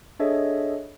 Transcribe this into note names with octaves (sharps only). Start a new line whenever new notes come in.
D4 G#4 A4 C#5 D#5 E5